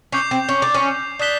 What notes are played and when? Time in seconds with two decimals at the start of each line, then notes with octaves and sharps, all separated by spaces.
0.12 C#4 D6 G6 C7 F7
0.31 C4
0.49 C#4
0.62 D4
0.75 C#4
1.19 D4 D#6 F#6 B6 E7 G7